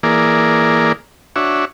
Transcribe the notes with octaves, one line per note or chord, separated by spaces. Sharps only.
E3 A#3 G#4 A#4 D5
D4 F#4 C#5 E5